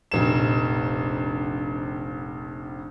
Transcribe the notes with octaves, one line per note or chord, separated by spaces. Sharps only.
F1 A#1 E7